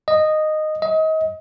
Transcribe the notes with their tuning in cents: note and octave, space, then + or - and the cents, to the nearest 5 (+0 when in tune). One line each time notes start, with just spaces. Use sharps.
D#5 -10
D#5 +30